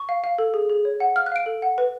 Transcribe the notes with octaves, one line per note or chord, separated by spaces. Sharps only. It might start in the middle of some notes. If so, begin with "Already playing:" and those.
Already playing: C#6
F5
F5
A4
G#4
G#4
C#5
F#5
F5 F6
F#6
F5 D7
A4
F#5
B4